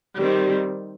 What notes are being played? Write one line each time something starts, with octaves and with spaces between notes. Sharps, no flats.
D#3 G3 C4